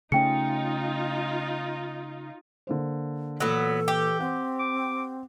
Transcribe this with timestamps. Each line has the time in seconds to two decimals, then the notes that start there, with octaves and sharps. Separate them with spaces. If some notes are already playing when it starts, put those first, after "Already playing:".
0.12 C#3 A3 C#4 D#4 F4 G5 C#7
2.67 D3 A#3 C5
3.40 A#2 E3 F#3 B3 A4 E6
3.88 G4
4.20 C4 F#5
4.59 D6